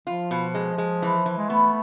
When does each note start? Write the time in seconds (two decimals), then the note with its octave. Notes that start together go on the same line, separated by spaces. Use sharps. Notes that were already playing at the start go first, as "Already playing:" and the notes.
0.07 F3 F4
0.31 B2
0.54 G#3
0.78 G#3
1.02 E3
1.25 E3
1.37 G#3
1.49 A3 B3